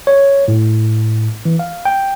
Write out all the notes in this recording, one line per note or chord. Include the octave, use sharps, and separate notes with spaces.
C#5
A2
E3
F5
G5